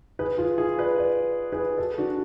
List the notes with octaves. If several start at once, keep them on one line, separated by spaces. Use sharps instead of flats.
G#4 B4
F4 G#4
F4 G#4
B4 D5
B4 D5
G#4 B4
F#4 A4
D4 F#4